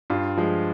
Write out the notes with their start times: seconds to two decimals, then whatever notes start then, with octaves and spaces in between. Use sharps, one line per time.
0.10 G2 F4
0.37 F3 G#3